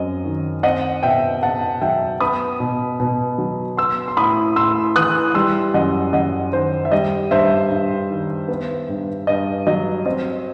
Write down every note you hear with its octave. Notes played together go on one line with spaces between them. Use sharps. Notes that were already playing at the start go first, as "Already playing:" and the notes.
Already playing: F#2 C4 D#5
D#3
C4 D#5 F#5
B2 E5 G5
B2 F#5 A5
F#3 E5 G5
B3 B5 D#6
B2
B2
F#3
B3 C6 E6
C6
A2 B5 D#6
A2 C6 E6
E3 D#6 F#6
G3 C6 E6
F#2 D#5 F#5
F#2 D#5 F#5
D#3 C5
E5
G3 D#5
G2 C5 E5
G2
D#3
B3
G2
G2 D#5
F#3 D#5
C4 D#5